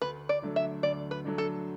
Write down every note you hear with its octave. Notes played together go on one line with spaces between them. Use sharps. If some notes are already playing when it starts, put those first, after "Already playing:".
D2 B4
D5
D3 F#3 A3 D4
E5
D2 D5
B4
D3 F#3 A3 D4
A4